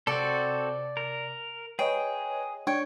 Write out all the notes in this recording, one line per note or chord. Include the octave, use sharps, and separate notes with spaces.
C3 C4 F#4 A4 D5
A#4
G#4 B4 C#5 D#5 G5
D4 C#5 G5